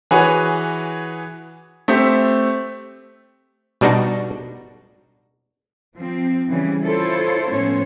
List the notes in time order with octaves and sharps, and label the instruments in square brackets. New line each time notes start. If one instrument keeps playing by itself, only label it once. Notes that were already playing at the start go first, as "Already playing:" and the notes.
[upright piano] E3 F#4 G#4 B4 C#5 G#5
A3 C4 G4 E5
[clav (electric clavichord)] B2 G3 D4 D#4 F#4
[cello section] F3 C4
C#3 E3 G3
E4 F4 A4 C5 C#5
A2 F3 B3 C#4 C5 C#5